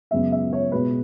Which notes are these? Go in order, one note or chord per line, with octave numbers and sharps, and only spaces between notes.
F#2 C#3 G#3 B3 E5
E5
C#5
B2 G#3 B3 B4